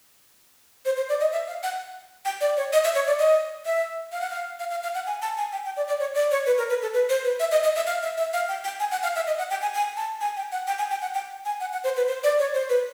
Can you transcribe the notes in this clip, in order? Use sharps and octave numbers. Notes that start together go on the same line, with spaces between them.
C5
C5
D5
D#5
E5
F5
F#5
G5
D5
C#5
D#5
E5
C#5
D5
D#5
E5
F5
F#5
F5
F5
F5
F5
F#5
G#5
A5
G#5
G5
G5
D5
D5
C#5
D5
C#5
B4
A#4
B4
A4
B4
C5
B4
E5
D#5
D#5
E5
F5
E5
E5
F5
G5
G5
G#5
F#5
F5
E5
D#5
F#5
G5
G#5
G#5
A5
G#5
G5
F#5
G5
G#5
G5
F#5
G5
G#5
F#5
F#5
C5
B4
C5
D5
C#5
C5
B4